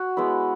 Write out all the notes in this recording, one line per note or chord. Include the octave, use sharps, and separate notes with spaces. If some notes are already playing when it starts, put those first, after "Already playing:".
Already playing: F#4
G#3 B3 E4